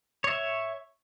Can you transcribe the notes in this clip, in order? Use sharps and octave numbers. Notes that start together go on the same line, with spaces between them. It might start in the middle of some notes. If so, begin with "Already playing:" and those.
C#5 E5